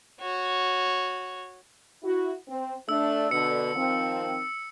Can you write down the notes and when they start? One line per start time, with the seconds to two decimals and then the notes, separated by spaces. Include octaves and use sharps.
0.20 F#4 C#5
2.03 E4 F#4
2.48 C4
2.89 A3 D4 E6
3.31 B2 D3 C#7
3.76 D#3 F3 C4